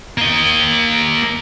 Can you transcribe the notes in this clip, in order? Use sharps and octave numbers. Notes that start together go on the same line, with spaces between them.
A#3 D#5